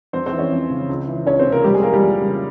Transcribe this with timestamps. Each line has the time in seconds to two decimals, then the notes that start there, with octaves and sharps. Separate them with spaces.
0.13 F2 C4 C5
0.26 C4 C5
0.32 E3
0.38 C#4 C#5
0.52 F2
0.70 C#3
0.89 C#2
1.07 E3
1.27 C#2 C#4 C#5
1.39 C4 C5
1.46 C3
1.52 A#3 A#4
1.64 F2 G3 G4
1.73 G#3 G#4
1.83 E3 A#3 A#4
1.93 G3 G4
2.02 F2
2.20 C#3